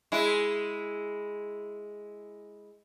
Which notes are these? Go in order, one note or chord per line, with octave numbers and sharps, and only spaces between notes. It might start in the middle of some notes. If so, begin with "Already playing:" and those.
G#3 E4